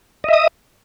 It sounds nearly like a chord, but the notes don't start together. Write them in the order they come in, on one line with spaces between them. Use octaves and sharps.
D#5 E5 D#6